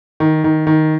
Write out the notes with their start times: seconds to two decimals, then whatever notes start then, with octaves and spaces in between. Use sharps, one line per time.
0.20 D#3
0.44 D#3
0.67 D#3